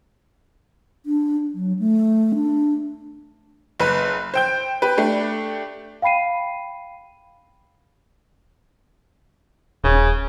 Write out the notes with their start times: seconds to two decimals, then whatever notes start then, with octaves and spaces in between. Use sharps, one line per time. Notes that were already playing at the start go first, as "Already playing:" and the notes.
1.06 D4
1.54 F#3
1.79 A3
2.35 D4
3.80 F#1 B4
4.34 C5 G5 G6
4.82 G4 B4
4.97 A3 D4 G4
6.02 F5 G5 B5 C7 D#7
9.84 D#1 C#3